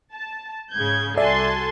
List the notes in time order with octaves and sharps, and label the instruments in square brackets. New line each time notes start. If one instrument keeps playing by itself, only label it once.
[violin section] A5
[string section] G#2 C#3 [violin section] G6 G#6
[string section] C2 F#4 A5 [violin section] A4 G#5 C6 [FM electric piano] D5 E5